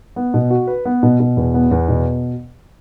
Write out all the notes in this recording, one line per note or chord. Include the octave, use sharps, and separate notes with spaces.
B3
B2
F#4
B4
B3
B2
B2
E2
B3
E2
B2